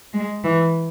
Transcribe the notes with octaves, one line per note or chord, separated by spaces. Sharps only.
G#3
E3